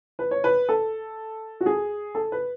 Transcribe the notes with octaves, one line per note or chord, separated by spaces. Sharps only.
B4
C#5
B4
A4
F#4
G#4
A4
B4